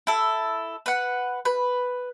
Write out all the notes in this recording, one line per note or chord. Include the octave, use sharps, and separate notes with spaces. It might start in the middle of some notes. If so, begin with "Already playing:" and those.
E4 A4
B4 F#5
B4